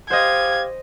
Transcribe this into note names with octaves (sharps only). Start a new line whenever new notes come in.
G4 C5 D#5 F5 G#6